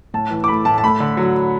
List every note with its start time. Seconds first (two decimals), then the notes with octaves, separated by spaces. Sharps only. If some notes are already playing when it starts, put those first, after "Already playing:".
0.14 A2 A5
0.31 E3
0.44 D6
0.48 A3 B5
0.65 A2 A5
0.78 A5
0.84 A3 B5
1.00 D3
1.17 F#3